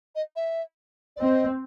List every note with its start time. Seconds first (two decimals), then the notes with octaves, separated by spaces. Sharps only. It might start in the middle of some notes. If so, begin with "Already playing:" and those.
0.15 D#5
0.36 E5
1.16 D5
1.20 C4 D#5